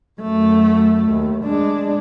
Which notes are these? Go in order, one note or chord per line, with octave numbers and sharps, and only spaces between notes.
F#2 A3
D#2
G#3 D4